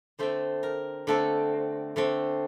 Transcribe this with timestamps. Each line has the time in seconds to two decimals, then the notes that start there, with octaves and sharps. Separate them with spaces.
0.19 D3 A3 C4 C5
0.63 A#4
1.07 D3 A3 C4 A4
1.96 D3 A3 C4